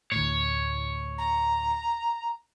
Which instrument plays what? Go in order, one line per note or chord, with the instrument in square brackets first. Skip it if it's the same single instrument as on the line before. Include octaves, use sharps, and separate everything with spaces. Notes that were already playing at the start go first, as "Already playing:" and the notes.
[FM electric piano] D2 A2 [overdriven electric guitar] C#5
[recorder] A#5